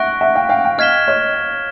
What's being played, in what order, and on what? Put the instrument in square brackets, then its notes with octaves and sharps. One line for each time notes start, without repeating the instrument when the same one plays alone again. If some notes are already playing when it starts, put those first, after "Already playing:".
Already playing: [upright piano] E5 F#5 [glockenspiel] C#6 F#6 A#6 D7
[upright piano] E5 F#5
F5 G5
F5 G5
F5 G5
[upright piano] D#5 F5 [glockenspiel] F6 G#6 B6 E7 G7
[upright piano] C#5 D#5